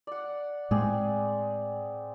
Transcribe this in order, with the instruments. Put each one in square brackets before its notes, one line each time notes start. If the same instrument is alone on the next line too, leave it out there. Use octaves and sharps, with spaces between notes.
[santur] D5 F#5
[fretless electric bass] A2 G#3 [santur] C4 G#4 D5